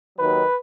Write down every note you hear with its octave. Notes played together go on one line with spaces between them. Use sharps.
D#2 D#3 F#3 B4